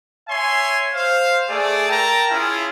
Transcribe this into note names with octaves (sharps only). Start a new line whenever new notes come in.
C#5 E5 G#5 C6
C5 F5
A3 G#4 D5
A#4 G5 A5 A#5
C#4 E4 F4 G#4